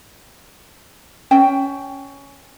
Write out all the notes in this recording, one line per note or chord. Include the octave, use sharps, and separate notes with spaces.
C#4 G5